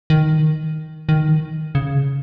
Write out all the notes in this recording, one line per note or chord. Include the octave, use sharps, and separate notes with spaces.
D#3
D#3
C#3